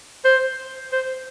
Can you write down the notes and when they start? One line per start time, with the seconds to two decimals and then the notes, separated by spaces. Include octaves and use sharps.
0.25 C5
0.92 C5